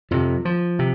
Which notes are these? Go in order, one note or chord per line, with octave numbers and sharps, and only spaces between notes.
F2 C3 F3
F3
C3